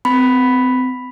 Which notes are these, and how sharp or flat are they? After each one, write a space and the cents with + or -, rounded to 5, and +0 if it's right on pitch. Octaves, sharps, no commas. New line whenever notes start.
C4 -35 B5 +0